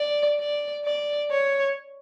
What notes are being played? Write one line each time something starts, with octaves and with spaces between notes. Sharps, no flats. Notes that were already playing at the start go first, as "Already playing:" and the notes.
Already playing: D5
D5
D5
C#5